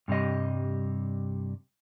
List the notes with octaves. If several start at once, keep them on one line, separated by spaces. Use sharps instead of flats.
G2 C3 G3 D#5